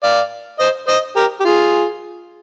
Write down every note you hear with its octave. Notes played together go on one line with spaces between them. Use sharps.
D5 F5
C5 D#5
C5 D#5
G4 A#4
G4
F4 G#4